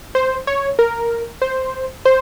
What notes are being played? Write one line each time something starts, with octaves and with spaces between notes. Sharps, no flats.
C5
C#5
A#4
C5
C5